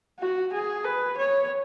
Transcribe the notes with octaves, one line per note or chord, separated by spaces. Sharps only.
F#4
G#4
B4
C#5